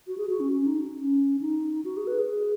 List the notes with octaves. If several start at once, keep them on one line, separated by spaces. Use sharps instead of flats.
F#4
G#4
F#4
C#4
C#4
D#4
C#4
D#4
F#4
G#4
B4
G#4